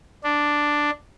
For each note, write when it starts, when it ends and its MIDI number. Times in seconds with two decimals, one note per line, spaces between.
0.24 0.91 62